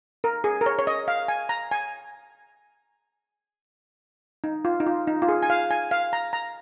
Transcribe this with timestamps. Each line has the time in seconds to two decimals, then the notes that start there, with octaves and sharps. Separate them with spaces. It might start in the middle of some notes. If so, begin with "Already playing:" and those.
0.24 A#4
0.44 G#4
0.61 A#4
0.66 C#5
0.79 C#5
0.87 D#5
1.08 F5
1.28 G#5
1.49 A#5
1.71 G#5
4.44 D#4
4.65 F4
4.80 D#4
4.87 F4
5.07 D#4
5.22 F4
5.28 G#4
5.43 G#5
5.50 F5
5.71 G#5
5.91 F5
6.13 A#5
6.33 A#5